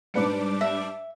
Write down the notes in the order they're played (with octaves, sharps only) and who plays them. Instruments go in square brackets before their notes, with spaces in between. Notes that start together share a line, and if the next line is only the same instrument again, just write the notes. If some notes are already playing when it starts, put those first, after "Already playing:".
[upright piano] G#2 B4 C#7 [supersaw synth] G3 D4 D6
[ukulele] E5